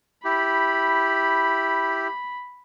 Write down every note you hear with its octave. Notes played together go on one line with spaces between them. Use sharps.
E4 G4 B5